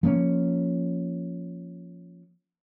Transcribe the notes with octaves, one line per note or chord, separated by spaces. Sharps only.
F3 A#3 C4 C#4